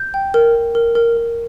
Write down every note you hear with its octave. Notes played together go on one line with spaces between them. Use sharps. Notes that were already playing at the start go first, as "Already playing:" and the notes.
Already playing: G6
G5
A#4
A#4
A#4
A#4
A#4